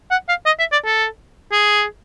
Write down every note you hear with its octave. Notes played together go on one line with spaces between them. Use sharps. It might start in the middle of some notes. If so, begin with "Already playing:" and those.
F#5
F5
D#5
E5
D5
A4
G#4